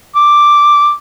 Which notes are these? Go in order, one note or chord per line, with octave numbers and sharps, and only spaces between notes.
D6